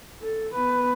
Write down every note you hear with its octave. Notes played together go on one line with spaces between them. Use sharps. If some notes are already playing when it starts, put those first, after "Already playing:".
A4
B3 B4